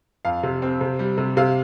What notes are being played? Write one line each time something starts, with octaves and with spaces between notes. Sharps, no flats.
F2 F5
C3
C4
C3
G3
C3
C3 F5